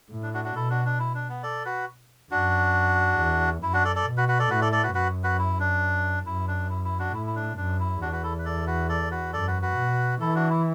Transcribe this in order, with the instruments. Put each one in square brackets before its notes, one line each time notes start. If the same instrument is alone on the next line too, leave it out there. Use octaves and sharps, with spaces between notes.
[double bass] A2
[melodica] D4
D4 F#4
D4 F#4
[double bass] B2 [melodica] E4 A4
[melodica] D4 F#4
D4
E4
D4
B3
A4 D5
F#4 B4
[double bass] F#2 [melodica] D4 F#4
[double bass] E2
[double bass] F#2 [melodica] E4
[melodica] D4 F#4
A4 D5
A4 D5
[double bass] B2
[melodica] F#4 B4
F#4 B4
A4 D5
[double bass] A2 [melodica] F#4 B4
[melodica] A4 D5
A4 D5
F#4 B4
[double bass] F#2 [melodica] F#4 B4
[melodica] F#4 B4
E4
D4
[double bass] F#2 [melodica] E4
[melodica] D4
E4
E4
D4 F#4
[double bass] A2 [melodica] E4
[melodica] E4
D4
[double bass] F#2 [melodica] D4
[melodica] E4
[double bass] E2 [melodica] D4 F#4
[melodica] F#4 B4
E4 A4
B4
A4 D5
F#4 B4
A4 D5
F#4 B4
[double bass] F#2 [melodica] A4 D5
[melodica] F#4 B4
F#4 B4
[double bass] B2
[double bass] E3 [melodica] E4 A4
[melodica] D4 F#4
E4